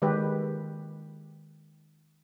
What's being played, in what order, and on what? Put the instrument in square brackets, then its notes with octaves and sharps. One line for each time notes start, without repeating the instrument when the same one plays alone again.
[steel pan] D#3 G#3 G4 B4